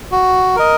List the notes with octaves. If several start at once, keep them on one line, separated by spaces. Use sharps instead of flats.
F#4
A#4 D#5